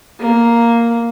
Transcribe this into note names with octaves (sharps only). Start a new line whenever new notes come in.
A#3